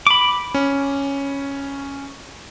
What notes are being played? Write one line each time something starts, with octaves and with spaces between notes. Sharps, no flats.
B5 D6
C#4